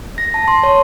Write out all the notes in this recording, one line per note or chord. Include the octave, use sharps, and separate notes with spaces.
A#6
A5
C6
C#5